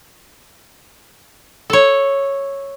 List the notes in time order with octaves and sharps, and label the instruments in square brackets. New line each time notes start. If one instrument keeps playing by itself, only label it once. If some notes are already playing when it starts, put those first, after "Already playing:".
[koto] A4 C#5